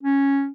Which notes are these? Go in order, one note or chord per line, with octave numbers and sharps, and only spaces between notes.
C#4